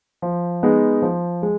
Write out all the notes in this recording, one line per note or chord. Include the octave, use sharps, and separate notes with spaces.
F3
G#3 B3 D#4
F3
G#3